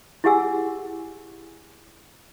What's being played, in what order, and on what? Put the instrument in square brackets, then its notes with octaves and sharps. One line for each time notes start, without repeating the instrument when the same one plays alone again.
[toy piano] E4 G4 G#4 F#5 G#5 E6